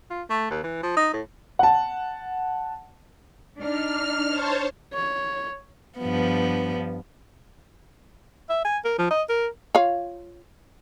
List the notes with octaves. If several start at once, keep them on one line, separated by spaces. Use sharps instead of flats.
F4
A3
D#2
E3
F3
D#4
A2
F#5 A5
D4 D#4 F6
C5 C#5 A5
C#5
G2 F3 B3
E5
G#5
A#4
F3
D#5
A#4
F4 C#5 F5